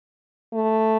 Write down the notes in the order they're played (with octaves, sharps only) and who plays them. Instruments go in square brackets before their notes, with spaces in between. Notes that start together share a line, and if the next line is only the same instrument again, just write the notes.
[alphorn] A3